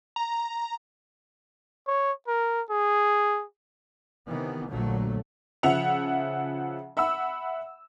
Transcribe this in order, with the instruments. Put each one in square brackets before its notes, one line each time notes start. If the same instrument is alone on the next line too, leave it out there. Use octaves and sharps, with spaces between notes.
[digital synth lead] A#5
[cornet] C#5
A#4
G#4
[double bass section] C3 D#3 E3 B3
A#1 D#2 A#2 D3 F#3 A3
[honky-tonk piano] C#3 F3 E5 F#5 F7
E5 F#5 B5 E6